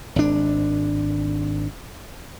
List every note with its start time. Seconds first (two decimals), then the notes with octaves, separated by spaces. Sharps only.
0.16 G#1 D4